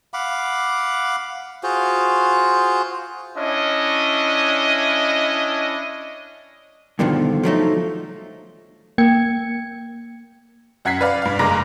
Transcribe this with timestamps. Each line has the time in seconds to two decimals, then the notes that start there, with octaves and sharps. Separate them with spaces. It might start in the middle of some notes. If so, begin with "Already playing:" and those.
0.14 F5 F#5 B5 D6
1.63 F4 F#4 G#4 C5
3.36 C#4 D4 E4 D#5
6.99 G2 B2 D3 D#3 F3
7.44 F3 F#3 A3 D#4
8.98 A#3 G5 G#6 C#7
10.85 F#2 F#5 G#6 B6 C7
11.01 B4 D5 F5
11.22 G2 F5
11.39 F#1 G2 G#3 A#5 D6 A#6